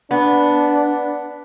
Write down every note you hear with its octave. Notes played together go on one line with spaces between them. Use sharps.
B3 D4